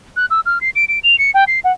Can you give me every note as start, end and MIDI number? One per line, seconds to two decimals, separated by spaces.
0.16 0.26 90
0.30 0.40 88
0.46 0.61 89
0.61 0.70 96
0.75 0.85 98
0.88 0.99 98
1.03 1.18 101
1.18 1.31 97
1.34 1.44 79
1.47 1.60 96
1.64 1.72 78